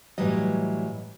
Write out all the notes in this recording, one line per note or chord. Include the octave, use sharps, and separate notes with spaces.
A2 E3 F#3 G3 D#5